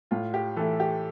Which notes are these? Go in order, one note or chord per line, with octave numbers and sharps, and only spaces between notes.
A2 F4
G4
E3 A3 A4
G4